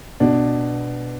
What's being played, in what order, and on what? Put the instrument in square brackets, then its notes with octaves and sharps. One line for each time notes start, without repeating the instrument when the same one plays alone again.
[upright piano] B2 D4